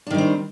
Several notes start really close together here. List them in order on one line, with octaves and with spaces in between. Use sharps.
D4 D#3 G3 C4